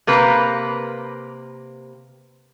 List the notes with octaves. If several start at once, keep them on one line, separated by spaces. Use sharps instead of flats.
C3 A#3 B4